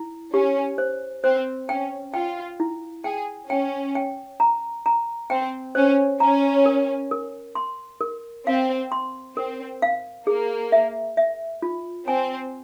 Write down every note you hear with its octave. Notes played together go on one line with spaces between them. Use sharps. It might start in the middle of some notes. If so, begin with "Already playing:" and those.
Already playing: E4
C#4 G4
C5
C4 C5
C#4 G5
F4 G5
E4
G#4 G5
C#4 G5
G5
A#5
A#5
C4 G5
C#4 C5
C#4 A#5
A#4
A#4
C6
A#4
C4 F5
C6
C4 A#4
F5
A#3 G#4
E5
E5
F4
C4 G#5